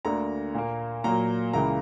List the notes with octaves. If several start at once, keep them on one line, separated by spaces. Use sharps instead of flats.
D2 D3 A#3 A#5
A#2 A#3
A#2 F#3 A#3 A#5
C#2 C#3 E3 A#3 A#5